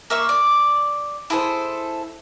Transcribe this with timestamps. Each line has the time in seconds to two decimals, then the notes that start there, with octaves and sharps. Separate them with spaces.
0.10 A#3 E5 C#6
0.29 D5
1.30 E4 G#4 A4 C5